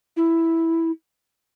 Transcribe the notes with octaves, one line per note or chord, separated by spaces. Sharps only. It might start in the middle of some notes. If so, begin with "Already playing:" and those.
E4